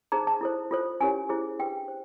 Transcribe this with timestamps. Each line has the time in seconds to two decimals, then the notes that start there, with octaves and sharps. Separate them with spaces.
0.12 D#4 G#4 C5 A#5
0.27 A5
0.41 E4 A4 C5
0.71 F4 A4 C5
1.00 C#4 E4 G4 A#4 C#5 G#5
1.29 E4 G#4 C5
1.59 D4 G4 B4 G5
1.88 C5